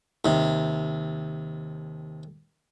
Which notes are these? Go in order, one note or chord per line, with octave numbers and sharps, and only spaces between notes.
D#2 C3